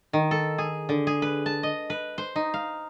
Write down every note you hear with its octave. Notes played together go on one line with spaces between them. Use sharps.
D#3
A4
G#4
D3
G#4
B4
A5
D#5
B4
C5
D#4
F5